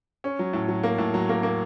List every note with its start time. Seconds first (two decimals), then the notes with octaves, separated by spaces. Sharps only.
0.24 C#4
0.39 F#3
0.53 A2
0.69 F#3
0.83 A#3
0.98 A2
1.14 F#3
1.29 A#3
1.43 A#3